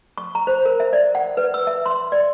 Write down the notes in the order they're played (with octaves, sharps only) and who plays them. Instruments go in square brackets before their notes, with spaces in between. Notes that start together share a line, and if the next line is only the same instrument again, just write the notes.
[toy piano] C#6
A#5
C5
A#4
E5
D5
F#5
B4
E6
E5
C6
D5